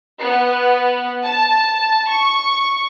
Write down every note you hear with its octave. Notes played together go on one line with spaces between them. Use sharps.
B3
A5
C#6